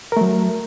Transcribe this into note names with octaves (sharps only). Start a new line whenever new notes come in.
F#3 A3 A#4